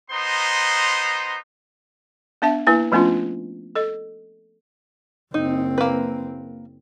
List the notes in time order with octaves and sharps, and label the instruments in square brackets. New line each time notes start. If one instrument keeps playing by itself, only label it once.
[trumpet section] B3 D#4 C5 A#5 C6
[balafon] B3 D4 E5 A5
A#3 E4 B4 G#5
F3 A3 B3 C#4 D4 F4
A4 D#5
[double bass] F#1 C4 [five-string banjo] D#4
[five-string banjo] A#3 B4